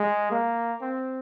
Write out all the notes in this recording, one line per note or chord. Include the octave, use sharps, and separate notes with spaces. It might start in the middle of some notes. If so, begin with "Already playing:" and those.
Already playing: G#3
A#3
C4